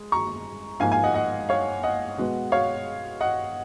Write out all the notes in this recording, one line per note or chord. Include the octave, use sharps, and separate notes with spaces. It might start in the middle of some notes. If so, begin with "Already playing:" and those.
Already playing: G#3
A#5 C#6
G#2 F3 A#3 F5 G#5
F5 G#5
D#5 F#5
D#5 F#5
C#5 F5
D#5 F#5
B2 G#3 B3
C#5 F5
D#5 F#5